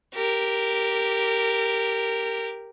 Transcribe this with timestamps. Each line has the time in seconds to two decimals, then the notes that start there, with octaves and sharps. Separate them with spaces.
0.14 G4 A#4